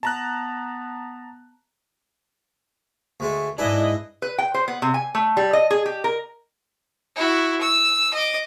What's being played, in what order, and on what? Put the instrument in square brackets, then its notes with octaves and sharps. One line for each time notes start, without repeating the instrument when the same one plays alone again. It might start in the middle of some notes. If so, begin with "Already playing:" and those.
[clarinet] B3 [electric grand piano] A5 A#5 F#6
[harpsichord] D2 G#3 A3
[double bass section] G#2 [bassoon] D4 [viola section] E4 D#5 [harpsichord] G#4 B4
[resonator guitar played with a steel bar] B4
G5
C5
B3
C3
G#5
A3
G3
D#5
G#4
G4
A#4
[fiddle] E4 F#4
E6
D#5 D6